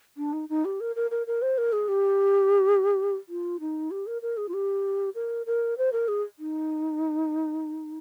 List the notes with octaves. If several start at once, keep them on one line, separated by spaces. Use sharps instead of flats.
D4
D#4
D#4
G4
A#4
A#4
A#4
A#4
C5
A#4
G#4
G4
F4
D#4
G4
A#4
A#4
G#4
F4
G4
A#4
A#4
C5
A#4
G#4
D#4